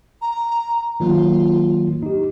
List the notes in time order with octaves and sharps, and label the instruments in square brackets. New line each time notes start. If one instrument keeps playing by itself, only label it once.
[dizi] A#5
[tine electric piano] D#3 F#3 A#3 [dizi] F4
[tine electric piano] D#4 G4